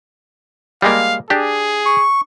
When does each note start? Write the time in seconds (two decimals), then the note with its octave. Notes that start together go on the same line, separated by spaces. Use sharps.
0.82 G3 G#3 A#3 F5
1.30 D4 G4 G#4
1.86 C#6